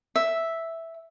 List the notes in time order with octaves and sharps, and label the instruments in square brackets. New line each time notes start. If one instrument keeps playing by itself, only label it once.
[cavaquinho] E5